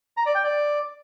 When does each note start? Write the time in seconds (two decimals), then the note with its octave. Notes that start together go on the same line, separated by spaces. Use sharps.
0.17 A#5
0.26 D5
0.35 G5
0.44 D5